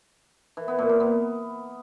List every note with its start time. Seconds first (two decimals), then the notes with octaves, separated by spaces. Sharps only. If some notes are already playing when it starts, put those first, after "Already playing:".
0.57 E3
0.68 B3
0.79 A#2
0.89 A#2
1.00 B3